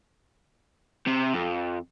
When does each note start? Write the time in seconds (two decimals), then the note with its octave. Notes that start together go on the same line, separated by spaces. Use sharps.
1.07 C3
1.34 F2